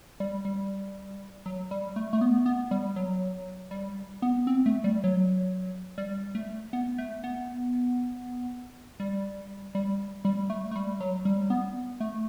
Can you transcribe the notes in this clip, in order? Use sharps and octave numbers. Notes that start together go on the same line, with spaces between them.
G3
G3
F#3
G3
A3
A3
B3
B3
G3
F#3
G3
B3
C4
A3
G3
F#3
G3
A3
B3
A3
B3
G3
G3
G3
A3
A3
G3
F#3
G3
B3
A3